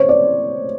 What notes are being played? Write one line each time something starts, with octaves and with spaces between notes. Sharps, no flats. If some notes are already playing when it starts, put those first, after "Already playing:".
Already playing: C5 C#5
D5